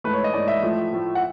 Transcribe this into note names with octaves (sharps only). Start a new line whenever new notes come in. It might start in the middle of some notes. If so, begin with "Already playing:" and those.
G#2 E3 A3 B4
C#5
D#5
G#2 E3 A3 D5
E5
A2 F3 A3
A2 F3 A3
F#5